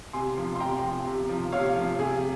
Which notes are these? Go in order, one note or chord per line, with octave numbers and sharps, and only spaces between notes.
C3 G#5 C6
F3
C6
C3 G5 A#5
F3
C3
F3
C3 C#5 F5
F3
C3 G#4